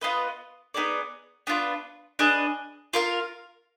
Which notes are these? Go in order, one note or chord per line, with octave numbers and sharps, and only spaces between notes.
B3 F4 B4 D#5
B3 D#4 G#4 D5
B3 D4 F4 B4
D4 G#4 B4 D#5
F4 A#4 F5